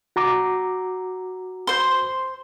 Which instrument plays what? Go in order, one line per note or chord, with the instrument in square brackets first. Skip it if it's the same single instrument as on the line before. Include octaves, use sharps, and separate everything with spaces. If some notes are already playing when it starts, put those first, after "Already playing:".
[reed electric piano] F#4 A#5 D6
[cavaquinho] C5 C6